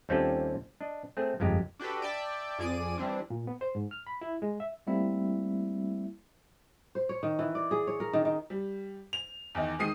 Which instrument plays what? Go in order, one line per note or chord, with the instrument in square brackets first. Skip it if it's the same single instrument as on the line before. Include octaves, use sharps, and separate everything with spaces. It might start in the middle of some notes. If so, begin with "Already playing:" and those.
[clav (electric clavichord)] D#2 G3 C4 C#4 F4 A4
D4 D#5
A3 C4 G#4
G1 F2 G#3 G4 A#5
[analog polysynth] D4 F#4 G4 A4 B4
D5 E5 G5 A5
F2 G#4 D5 D#7
E3 G3 C4 D4
[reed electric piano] A#2
B3
C5
G#2
F6
B5
E4
G#3
E5
[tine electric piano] G3 A3 A#3 C4 E4 E5
[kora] C5
C#5
D#3
E3
D5
G#4
C#5
A#4
D#3
D#3
[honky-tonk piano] G3
F7
E2 D#3 D#5
D#3 G#3 D#6 C7 D#7